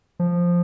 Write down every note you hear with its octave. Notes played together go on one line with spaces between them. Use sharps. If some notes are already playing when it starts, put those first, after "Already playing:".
F3